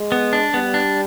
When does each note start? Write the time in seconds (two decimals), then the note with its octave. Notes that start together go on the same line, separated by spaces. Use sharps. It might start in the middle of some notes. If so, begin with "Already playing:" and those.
Already playing: G#3
0.12 B3
0.33 D4
0.54 G3 B3
0.74 D4